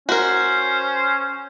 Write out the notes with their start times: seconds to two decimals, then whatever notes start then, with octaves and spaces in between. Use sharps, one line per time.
0.09 C#4 F#4 A#4 C5